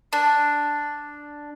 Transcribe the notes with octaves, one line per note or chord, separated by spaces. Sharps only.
D4